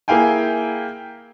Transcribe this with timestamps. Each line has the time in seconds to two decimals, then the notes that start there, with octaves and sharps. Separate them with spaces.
0.08 A#3 E4 G#4 F5 G5 G#5